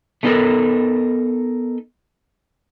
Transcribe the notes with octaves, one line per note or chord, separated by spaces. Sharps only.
A3 B3 D#4 G4 A4 A#4